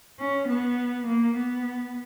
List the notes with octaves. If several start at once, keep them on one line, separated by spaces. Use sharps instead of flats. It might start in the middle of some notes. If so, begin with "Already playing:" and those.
C#4
B3
A#3
B3